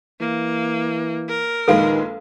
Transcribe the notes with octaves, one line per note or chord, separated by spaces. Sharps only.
E3 A#3
A#4
A#1 D#3 G#3 A4 B4 F5